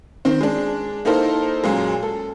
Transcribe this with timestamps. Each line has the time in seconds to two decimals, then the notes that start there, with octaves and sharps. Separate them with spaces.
0.25 D#3 C4 C5
0.41 G#3 D4
1.05 A#3 D#4 E4 A4 A#4 C5
1.64 F#2 A#2 G#3
2.03 A4